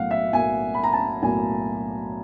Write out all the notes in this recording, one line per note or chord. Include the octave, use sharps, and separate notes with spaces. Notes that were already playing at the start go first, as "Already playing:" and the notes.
Already playing: B1 A2 F#3 A#3 F5 F#5
E5
B1 A2 F#3 A#3 G#5
B5
A#5
A5
B1 A2 F#3 A#3 G#5